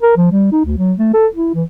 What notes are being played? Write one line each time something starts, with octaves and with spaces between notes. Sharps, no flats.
A#4
F3
G3
D#4
D2
F#3
A3
A4
E4
E3